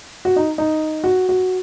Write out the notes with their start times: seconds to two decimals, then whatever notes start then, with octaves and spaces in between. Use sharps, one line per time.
0.25 F#4
0.36 D#4
0.58 D#4
1.04 F#4
1.29 F#4